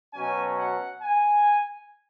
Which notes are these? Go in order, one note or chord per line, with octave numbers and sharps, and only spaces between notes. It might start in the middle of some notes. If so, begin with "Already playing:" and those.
B2 F#3 C#4 G#5
F#5
G#5